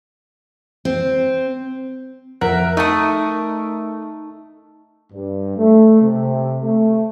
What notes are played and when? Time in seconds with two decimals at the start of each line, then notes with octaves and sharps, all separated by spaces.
0.85 C4
2.41 F2 A#4 E5 F#5 F#6
2.77 A3 D#4 A5 C#6 D#6
5.12 G2
5.57 A3
6.01 C3
6.63 A3